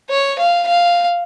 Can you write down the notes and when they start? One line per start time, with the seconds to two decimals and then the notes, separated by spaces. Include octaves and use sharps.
0.10 C#5
0.39 F5
0.68 F5